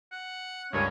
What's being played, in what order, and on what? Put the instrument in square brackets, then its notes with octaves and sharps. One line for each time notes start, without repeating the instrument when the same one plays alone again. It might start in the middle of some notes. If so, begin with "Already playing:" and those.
[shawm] F#5
[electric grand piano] C#2 G2 A#4 [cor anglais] C#4